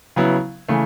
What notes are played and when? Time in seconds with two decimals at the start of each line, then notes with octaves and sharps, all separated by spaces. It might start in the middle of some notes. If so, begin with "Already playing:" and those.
0.16 C#3 F#3 B3 E4
0.68 C#3 E3 A3